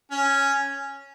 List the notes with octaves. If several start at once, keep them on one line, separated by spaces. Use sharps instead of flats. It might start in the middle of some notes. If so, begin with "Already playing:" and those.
C#4